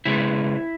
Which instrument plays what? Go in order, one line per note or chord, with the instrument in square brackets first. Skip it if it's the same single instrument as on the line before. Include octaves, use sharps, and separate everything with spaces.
[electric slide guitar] C#3 G#3 B3 E4